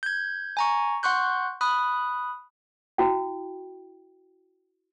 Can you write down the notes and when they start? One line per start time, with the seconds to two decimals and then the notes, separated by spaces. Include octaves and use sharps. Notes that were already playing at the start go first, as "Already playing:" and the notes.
0.03 G6 G#6
0.57 G#5 A#5 C#6
1.03 F#5 C6 C#6 F#6 G6
1.61 B5 D#6 F#6
2.98 E4 F#4 G5